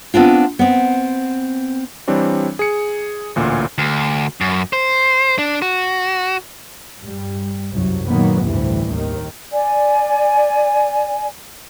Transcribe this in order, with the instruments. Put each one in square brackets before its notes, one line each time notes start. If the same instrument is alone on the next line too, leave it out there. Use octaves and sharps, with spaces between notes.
[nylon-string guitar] B3 C4 D4 F4
B3 C4
[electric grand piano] E3 G3 C4 D4 C#5
G#4 C#7
A1 D2 A#2
[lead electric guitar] D2
F#2
C5
D4
F#4
[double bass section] G2 G3
C2 F#2 F#3
A#2 D#3 F#3 A#3 B3
A1 D2 G2 C3 E3
D#2 D#3
[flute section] D5 G#5